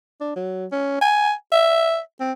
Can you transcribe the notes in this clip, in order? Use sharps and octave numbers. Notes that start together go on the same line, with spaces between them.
D4
F#3
C#4
G#5
E5
C4